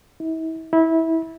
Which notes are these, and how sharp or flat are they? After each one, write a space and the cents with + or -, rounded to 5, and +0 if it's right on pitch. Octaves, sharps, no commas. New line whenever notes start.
E4 -40
E4 -20